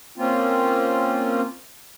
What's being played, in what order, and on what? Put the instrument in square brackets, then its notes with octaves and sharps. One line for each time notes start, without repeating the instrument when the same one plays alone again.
[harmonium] A#3 C4 C#4 F4